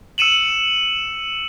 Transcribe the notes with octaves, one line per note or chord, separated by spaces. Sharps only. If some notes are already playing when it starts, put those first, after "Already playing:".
E6 C#7 D#7 E7 F#7